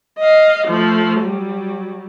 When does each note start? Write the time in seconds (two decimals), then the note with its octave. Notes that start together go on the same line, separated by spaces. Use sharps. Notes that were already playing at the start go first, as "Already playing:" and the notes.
0.19 D#5 F5
0.67 F3 A3
1.21 F#3 G3